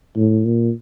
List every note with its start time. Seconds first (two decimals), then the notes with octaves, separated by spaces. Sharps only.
0.16 A2
0.45 A#2